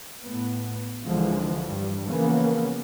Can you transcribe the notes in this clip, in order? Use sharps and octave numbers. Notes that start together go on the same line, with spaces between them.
A2 B3
C#2 D3 E3 F3 G#3
G2 G3
C#3 E3 F3 A#3 B3 C#4